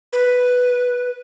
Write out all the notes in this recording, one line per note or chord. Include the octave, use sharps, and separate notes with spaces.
B4